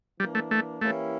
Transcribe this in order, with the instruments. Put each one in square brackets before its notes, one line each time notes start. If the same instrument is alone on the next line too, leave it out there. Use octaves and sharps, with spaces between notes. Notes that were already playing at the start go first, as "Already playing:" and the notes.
[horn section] E3 A#3 D4 [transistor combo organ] G3
[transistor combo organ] A3
A3
[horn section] E3 A#3 C#4 E4 G4 [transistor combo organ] A3